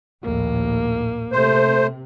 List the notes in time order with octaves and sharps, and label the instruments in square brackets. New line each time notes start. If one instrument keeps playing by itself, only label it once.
[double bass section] A#1 D#2 A2 [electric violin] A#3
[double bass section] C3 [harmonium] A3 [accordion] C5